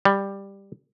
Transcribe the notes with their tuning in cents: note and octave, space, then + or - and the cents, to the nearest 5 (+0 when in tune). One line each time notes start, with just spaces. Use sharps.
G3 +10